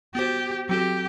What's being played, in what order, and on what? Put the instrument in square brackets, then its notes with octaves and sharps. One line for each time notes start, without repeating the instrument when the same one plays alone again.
[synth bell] B3 F#4 C5 [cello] G4
[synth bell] F#3 C4 F#4 A4 [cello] G4